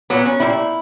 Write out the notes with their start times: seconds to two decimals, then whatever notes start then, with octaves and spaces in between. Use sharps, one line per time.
0.10 A#2 F#3 B3
0.25 C#4
0.40 A#2 G3 E4